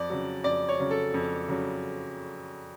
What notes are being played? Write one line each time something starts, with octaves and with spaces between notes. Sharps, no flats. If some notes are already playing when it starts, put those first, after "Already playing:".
Already playing: F2 D5
C#3 F#3
F2 D5
C#5
C#3 F#3
A4
F2
C#3 F#3